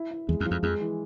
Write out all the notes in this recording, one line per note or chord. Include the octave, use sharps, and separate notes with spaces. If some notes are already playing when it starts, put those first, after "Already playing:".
Already playing: E4
E4
E2 G#3
F2
F3
F2
F2 G#3
E3